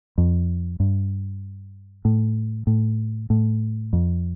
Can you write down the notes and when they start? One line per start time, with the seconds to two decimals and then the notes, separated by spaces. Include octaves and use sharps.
0.18 F2
0.80 G2
2.05 A2
2.67 A2
3.30 A2
3.93 F2